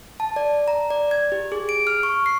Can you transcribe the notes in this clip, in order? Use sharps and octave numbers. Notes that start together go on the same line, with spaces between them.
A5
D5
A#5
D5
G#6
G4
G#4
D7
F6
C#6
C7